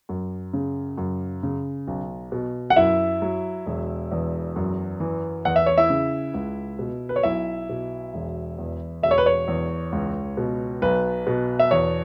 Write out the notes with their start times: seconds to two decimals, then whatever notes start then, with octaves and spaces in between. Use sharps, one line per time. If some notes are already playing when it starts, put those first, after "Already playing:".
0.09 F#2
0.54 C#3
0.98 F#2
1.43 C#3
1.87 B1
2.32 B2
2.70 F#5
2.76 F#2 E4 E5
3.22 F#3
3.66 E1
4.12 E2
4.56 F#2
5.00 E3
5.45 E2 F#5
5.56 E5
5.66 C#5
5.78 E4 E5
5.90 C#3
6.34 C#2
6.79 B2
7.09 B4
7.16 C#5
7.23 B1 E4 E5
7.69 B2
8.14 E1
8.59 E2
9.03 E1 E5
9.11 C#5
9.18 B4
9.26 C#5
9.48 E2
9.92 C#2
10.37 B2
10.82 B1 B4
11.27 B2
11.59 E5
11.71 E2 C#5